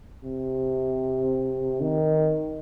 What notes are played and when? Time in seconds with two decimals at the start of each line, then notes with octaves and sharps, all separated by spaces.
0.24 C3
1.81 D#3